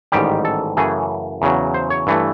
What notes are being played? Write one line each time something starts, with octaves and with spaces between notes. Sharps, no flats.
A1 G#2 D#3 G3 G4
A4
F#2 C#3 E3 A3 G#4
E2 C#3 F#3
C5
C#5
G2 E3 A3